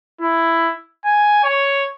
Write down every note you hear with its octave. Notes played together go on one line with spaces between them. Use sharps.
E4
G#5
C#5